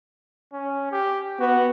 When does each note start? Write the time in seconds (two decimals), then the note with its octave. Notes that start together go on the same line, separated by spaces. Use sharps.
0.53 C#4
0.92 G4
1.39 B3 F#4